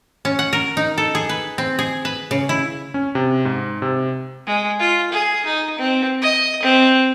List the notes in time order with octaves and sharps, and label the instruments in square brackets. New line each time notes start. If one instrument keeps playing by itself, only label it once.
[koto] C#4
F#5
A#4
D#4
A4
G#4
B4
C4
G#4
B4
C#3
E4
[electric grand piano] C#4
C3
G#2
C3
[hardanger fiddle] G#3
F4
G#4
D#4
C4
D#5
C4